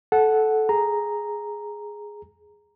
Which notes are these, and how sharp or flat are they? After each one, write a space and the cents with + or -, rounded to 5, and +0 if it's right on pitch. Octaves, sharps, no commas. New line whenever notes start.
A4 -15 F#5 +0
G#4 +0 A#5 +0